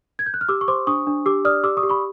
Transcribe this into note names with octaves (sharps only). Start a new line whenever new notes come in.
G#6
G6
F#6
F6
G4 D6 E6
C#6
C5 C6 D6
D4 C#6 D#6
D4
G4 D6 E6
D5 D#6 F6
G4 D6 E6
C#6 D#6
G4
B5 C#6